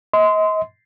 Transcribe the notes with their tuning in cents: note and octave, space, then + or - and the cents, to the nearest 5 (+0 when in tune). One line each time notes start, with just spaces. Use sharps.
D#5 +35 C6 -20